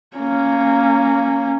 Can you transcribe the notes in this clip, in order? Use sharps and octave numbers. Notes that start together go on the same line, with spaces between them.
A#3 C#4